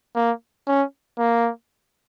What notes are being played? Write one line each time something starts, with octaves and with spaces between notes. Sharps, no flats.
A#3
C#4
A#3